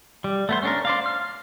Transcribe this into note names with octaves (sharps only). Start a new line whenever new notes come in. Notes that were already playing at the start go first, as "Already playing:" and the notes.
G3
A3 B3 C5
C#4 D4 A#4
C5 D5 F5
F6